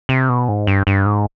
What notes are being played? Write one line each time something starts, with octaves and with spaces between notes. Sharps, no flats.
C3
B2
G#2
G2
G2
G#2